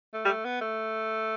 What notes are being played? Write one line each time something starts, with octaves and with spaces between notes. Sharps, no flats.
A3
G3
A3
B3
A3